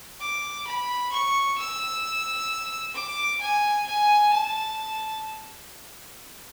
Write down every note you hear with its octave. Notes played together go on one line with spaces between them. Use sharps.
D6
B5
C#6
E6
D6
G#5
G#5
A5